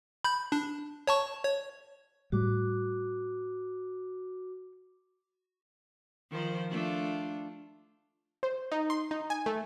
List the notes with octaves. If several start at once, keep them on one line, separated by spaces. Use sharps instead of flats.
B5 G6
D4
C#5 A5 C#6
C#5
A2 G3 F#4 D6
D#3 F3 C5
A3 D4 F4
C5
D#4
C6
D#4
G#5
A3